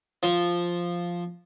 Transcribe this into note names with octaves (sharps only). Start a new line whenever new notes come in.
F3